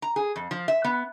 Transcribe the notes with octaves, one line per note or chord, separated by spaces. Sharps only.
A#5
G#4
F2
F3
E5
B3